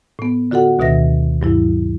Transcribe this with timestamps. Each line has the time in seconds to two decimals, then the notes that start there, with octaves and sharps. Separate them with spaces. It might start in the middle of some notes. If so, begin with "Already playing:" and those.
0.19 A2 B3
0.51 D3 F4 F#4 A4 F#5
0.79 D2 B2 D#3 E5 A#6
1.42 G2 F#3 E4